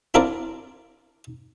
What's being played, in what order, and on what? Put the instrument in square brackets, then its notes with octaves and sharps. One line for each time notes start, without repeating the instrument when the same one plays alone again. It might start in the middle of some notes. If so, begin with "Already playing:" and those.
[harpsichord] C4 D4 E4 F4 A#4 D5